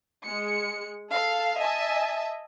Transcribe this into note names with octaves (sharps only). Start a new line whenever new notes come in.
G#3 C#7
A4 F5
D#5 E5 G#5 A5